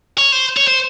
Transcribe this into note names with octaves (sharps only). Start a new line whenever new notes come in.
C#5
C5
C#5
C5